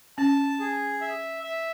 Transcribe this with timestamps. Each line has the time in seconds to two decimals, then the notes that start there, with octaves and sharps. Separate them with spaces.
0.18 C#4 A5
0.60 G#4
1.01 E5
1.43 E5